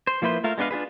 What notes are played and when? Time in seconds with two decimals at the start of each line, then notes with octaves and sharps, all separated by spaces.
0.07 C5
0.22 F3 A#3 E4 B4 C5
0.44 A3 F4 A#4 F5
0.58 G#3 B3 D4 B4 F5
0.71 D4 F4 G#4 B4